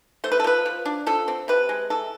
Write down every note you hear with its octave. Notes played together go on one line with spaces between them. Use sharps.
A3 C5
B4
A4
F3 B4
F3
D4
F3 A4
C4
C3 B4
G#3
E3 A4